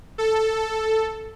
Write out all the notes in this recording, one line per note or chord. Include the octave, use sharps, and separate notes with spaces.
A4